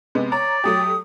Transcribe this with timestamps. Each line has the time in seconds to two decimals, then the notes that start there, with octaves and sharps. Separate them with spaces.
0.15 C3 G#3 B3
0.32 C#5 D5 A#5
0.64 F#3 A3 G4 D#6